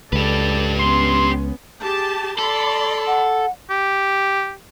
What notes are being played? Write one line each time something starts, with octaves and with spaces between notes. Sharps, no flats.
C#2 G4 A4 B4 D5
B3 C#4 C6
G4 G#4 A5
A4 D5 B5 C6
F#5
G4